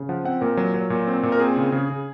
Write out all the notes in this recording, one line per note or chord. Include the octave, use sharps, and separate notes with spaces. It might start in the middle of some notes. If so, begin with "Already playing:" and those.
Already playing: C#3
F3 F#5
C4 F#5
A#2 A#4
F#3
F#3
A#2
C4
A#2
A#4
C4 G#4
C#3
C#3
C#3